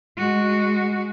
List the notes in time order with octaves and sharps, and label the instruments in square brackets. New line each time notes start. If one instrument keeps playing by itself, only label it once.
[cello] G#3 F#4